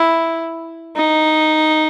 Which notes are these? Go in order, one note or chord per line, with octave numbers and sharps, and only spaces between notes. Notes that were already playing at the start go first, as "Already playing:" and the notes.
Already playing: E4
D#4